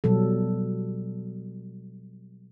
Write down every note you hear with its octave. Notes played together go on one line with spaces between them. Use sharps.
B2 F#3 G3 A4